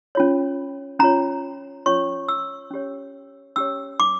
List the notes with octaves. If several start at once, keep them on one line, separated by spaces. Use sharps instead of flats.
C#4 F4 C#5
C#4 F4 C#5 A#5
C#4 F4 C#5 C#6
E6
C#4 G4 C#5
C#4 G4 C#5 E6
D6